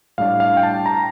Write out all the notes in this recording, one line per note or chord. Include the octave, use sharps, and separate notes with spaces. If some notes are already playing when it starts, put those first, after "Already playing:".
A2 G3 D4 F5
F5
G5
A5
A#5